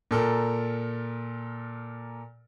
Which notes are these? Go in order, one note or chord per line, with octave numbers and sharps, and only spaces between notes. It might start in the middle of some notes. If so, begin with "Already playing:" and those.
A#2 A4 A#4